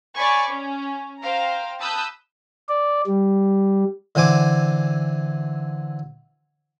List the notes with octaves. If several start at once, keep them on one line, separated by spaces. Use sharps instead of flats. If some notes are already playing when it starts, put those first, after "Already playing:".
C#5 D5 G#5 B5 C#6
C#4
C5 F5 G5 A#5
A5 B5 D#6 E6 F#6 G6
D5
G3
D3 E3 C4 G#5 D6